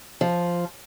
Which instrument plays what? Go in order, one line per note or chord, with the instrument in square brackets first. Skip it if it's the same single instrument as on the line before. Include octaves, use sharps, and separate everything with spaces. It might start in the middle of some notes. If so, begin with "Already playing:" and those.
[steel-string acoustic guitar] F3